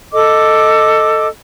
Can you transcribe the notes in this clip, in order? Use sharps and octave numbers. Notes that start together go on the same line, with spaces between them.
A4 D#5 D6